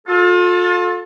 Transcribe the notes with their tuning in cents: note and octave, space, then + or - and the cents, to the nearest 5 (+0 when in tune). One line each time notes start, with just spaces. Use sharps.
F4 +35 A4 +0